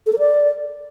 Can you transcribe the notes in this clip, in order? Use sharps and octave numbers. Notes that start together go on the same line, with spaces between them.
A4
A#4
D5